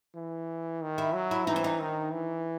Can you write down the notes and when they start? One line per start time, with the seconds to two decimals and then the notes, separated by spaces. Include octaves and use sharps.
0.15 E3
0.82 D#3
0.98 E4
1.14 F#3
1.31 E4
1.47 E3 D#4
1.56 C4
1.64 D#4
1.81 D#3
2.12 E3